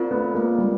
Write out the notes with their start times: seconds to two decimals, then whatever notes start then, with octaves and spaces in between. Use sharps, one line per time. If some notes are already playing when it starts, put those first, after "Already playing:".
Already playing: C4 F4 A#4 D5
0.11 A3 B3
0.34 G#3 A#3
0.58 G3